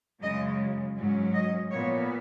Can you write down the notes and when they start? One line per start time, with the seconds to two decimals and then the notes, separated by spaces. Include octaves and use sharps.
0.22 F#2 C#3 G#3 D#5
0.97 G#2 F#3 C#4
1.34 D#5
1.71 A#2 F3 B3 C#5